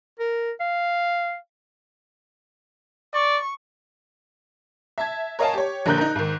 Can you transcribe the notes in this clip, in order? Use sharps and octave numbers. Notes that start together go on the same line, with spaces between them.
A#4
F5
D5 C#6
E5 A5 G#6
A#4 C#5 D#5 F5 G#5 A5
G4 C#5
A#1 D3 A#4 F#6 G6
D#4 A#4
G#2 D#3